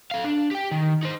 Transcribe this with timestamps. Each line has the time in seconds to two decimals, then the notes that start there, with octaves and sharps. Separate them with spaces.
0.11 A4 F5
0.24 D4
0.51 G4 G5
0.71 D#3
1.03 D#4 C5